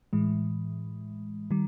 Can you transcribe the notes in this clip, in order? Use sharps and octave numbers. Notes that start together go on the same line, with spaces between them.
A2 E3 G#3
D#3 G3